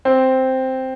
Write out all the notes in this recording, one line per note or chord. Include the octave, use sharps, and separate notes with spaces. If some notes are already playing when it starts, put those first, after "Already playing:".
C4